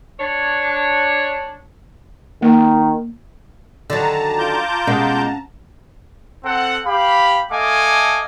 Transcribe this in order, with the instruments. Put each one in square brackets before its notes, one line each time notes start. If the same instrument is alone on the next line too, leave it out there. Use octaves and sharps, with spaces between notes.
[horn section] D4 C#5
[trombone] D#3 [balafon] A#3
[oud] D3 D#3 F#3 [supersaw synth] A5 A#5
[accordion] F4 D6 G6
[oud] B2 G#3 A#4 [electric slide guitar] C#4 F5 F#5
[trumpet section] C4 A4 F#5
G4 F5 B5
A3 A4 D#5 F5 G#5 D6